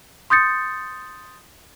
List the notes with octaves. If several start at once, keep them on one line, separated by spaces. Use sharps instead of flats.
C6 D#6 G6 A6 C#7